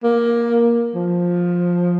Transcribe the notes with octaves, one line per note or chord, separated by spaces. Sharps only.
A#3
F3